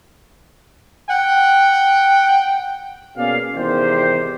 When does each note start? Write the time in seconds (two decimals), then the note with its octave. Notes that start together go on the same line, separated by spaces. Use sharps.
1.09 F#5 G5
3.17 B2 A#3 C#4 G#4 D5 F5
3.55 E2 G#2 C3 D#3 G4 C5